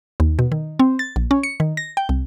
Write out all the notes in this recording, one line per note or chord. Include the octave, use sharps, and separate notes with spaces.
D#2
B2
D#3
C4
A6
A#1
C#4
C#7
D#3
A#6
G5
C2